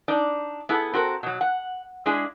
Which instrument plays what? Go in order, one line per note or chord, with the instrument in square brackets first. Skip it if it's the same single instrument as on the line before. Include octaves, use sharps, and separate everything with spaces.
[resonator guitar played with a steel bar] D4 D#4 D5
B3 E4 G#4 A4
C4 F#4 A4 A#4
B2 F#3
F#5
G#3 D4 E4 G#4